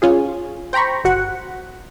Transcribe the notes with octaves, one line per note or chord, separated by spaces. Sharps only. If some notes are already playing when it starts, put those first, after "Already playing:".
C#4 F4 G#4
C5 G5 A#5 B5 C#6
G1 F#4 F#5